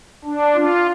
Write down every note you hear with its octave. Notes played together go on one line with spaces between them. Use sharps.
D4
F4